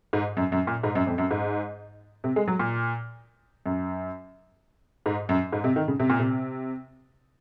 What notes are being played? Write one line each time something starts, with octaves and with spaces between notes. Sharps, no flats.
G#2
F#2
F#2
A#2
G#2
F#2
F2
F#2
G#2
C3
G#3
F#3
A#2
F#2
G#2
F#2
G#2
C3
D#3
C#3
C3
A#2
C3